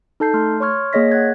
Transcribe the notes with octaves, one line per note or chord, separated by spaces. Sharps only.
D#4 A4 A5 G6 C7
A3 C6 F6
C#5 C6 C#6 F6 G#6
A#3 G#4 C#5 D#5 A#6 B6
F#5 F#6 G#6